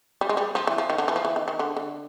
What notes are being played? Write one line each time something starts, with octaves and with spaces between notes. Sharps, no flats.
G3
G#3
G3
F3
E3
F3
D#3
D3
E3
F3
E3
D#3
D#3
D3
D3